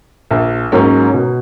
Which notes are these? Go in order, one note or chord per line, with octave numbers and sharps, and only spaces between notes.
A#1
G#2 F#3 A#3 C#4
B2